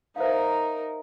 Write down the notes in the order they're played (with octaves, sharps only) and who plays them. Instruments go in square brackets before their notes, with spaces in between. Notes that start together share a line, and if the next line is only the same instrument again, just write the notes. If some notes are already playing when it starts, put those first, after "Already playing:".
[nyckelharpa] D#4 A#4 [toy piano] C5 E5 F5